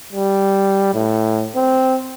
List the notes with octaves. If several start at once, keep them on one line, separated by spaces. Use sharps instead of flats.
G3
A2
C4